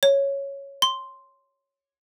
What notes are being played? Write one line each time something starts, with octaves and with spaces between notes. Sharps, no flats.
C#5
C6